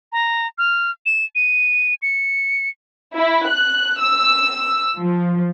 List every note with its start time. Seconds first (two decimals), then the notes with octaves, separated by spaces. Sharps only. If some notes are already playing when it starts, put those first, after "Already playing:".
0.12 A#5
0.58 F6
1.06 E7
1.35 D#7
2.02 C#7
3.16 E4
3.50 F#6
4.02 E6
4.98 F3